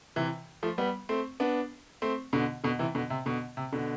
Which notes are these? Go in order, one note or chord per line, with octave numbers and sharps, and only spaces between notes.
C3 E3
F3 A3
G3 B3
A3 C4
B3 D4
A3 C4
B2 D3
B2 D3
C3 E3
B2 D3
C3
B2 D3
C3
B2 D3